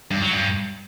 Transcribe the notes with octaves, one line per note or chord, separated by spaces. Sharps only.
G2
F#3
G2